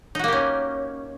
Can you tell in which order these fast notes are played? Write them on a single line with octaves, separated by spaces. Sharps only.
D#4 F#4 A#3 G4 C#4